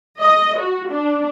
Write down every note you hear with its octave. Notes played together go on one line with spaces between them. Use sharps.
D#5
F#4
D4